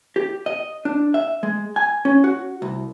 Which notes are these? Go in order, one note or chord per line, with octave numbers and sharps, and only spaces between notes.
G4
D#5
D4
E5
G#3
G#5
C#4
F#4
C2